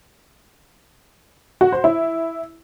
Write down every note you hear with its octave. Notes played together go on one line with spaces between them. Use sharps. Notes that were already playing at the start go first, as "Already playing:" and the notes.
F#4
C5
E4